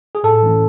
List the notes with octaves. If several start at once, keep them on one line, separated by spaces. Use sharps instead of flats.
G#4
A2 A4
E3 A3 C#4